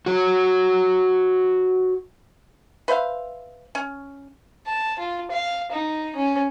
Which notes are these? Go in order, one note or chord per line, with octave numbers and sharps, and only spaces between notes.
F#4 C#5
B4 C5 E5 F5
C#4
A5
F4
F5
D#4
C#4